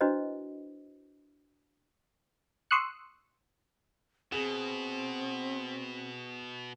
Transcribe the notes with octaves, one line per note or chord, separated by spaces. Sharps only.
D4 E4 F#4 B4 C5 D#5
C6 C#6 D#6 E6 F#6 C#7
B2 C4 G#4 F#7